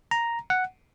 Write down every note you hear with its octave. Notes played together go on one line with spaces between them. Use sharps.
A#5
F#5